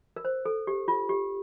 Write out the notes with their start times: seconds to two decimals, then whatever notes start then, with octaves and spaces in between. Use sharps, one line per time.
0.16 A#4
0.25 C5
0.45 A4
0.67 G4
0.88 F4
1.09 G4